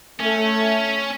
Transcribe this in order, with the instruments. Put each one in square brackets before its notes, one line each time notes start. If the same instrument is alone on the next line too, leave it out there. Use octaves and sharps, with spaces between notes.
[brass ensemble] A3 [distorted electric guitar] C#4